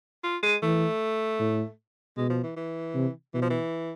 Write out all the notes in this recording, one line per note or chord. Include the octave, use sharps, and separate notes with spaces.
F4
G#3
E3 A3
A2
B2 G#3
F3
E3
E3
C3
B2 E3
F3
E3